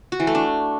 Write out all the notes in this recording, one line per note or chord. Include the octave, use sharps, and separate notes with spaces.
F#4
E3
A3
D4